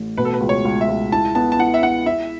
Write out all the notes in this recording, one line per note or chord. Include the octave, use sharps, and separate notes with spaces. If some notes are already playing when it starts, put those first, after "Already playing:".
Already playing: A1
B2 B4
A4
B4
C#2
C#5
C#2
E5
C#2
E4 A5
B3 A5
A5
E4 F#5
E5
E4 F#5
E4 E5